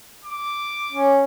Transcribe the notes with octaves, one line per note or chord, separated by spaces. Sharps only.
D6
C#4